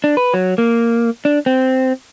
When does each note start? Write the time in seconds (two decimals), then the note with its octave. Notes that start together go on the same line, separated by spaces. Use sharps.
0.04 D4
0.17 B4
0.34 F#3
0.58 A#3
1.25 D4
1.46 C4